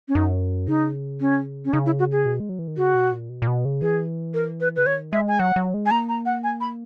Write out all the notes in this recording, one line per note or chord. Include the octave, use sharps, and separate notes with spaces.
C#4
F#2 D#4
C#3 D#4
C#4
C#4
C#3 D#4
E4
F#4
G#4
B2
G#3
F#3
E3
D#3
C#3 F#4
B2
A#2
B2
A#2
B2
C#3
E3 G#4
A#4
B4
C#3 B4
D#3 C#5
G#3 E5
G#5
F#3 F#5
F#3
G#3
G#5
A#3 A#5
A#5
F#5
G#5
B5